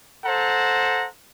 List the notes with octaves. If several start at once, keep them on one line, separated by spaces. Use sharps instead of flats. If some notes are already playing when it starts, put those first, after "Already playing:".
A4 C5 F#5 A#5